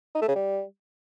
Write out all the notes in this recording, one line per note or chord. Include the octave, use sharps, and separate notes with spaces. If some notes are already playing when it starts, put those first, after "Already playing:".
D#4
A3
C#3
G3